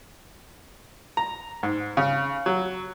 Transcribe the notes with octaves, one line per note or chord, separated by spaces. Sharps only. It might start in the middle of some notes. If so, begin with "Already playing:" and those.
A#5
G#2
C#3
F#3